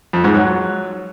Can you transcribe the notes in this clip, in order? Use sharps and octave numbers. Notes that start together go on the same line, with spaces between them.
F2
G#2
F#3